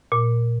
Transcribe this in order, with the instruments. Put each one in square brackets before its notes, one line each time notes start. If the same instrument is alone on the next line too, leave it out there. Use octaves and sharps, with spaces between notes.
[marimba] A#2